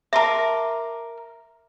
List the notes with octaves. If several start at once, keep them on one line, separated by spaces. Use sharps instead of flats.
A#4 E5 A5 C6 D6